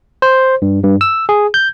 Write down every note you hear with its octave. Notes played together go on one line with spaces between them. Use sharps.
C5
G2
G2
E6
G#4
G6